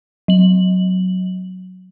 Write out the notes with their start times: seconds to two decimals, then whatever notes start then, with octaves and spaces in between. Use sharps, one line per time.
0.28 F#3 F#7